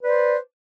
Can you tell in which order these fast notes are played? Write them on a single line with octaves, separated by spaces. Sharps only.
B4 D5 C5